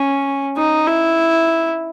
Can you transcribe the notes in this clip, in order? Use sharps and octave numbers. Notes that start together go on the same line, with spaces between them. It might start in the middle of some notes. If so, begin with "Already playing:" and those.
Already playing: C#4
D#4
E4